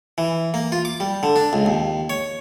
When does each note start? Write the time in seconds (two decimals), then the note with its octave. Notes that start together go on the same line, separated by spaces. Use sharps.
0.18 E3
0.54 A#3
0.72 F4
0.85 D6
1.00 G3
1.23 D3
1.36 D4
1.53 C#2
1.66 D#2
2.10 C#5